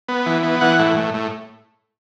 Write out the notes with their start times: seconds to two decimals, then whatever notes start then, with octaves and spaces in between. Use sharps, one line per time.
0.08 B3
0.26 E3
0.43 B3
0.61 E3 F#5
0.79 A2
0.97 A2
1.14 A2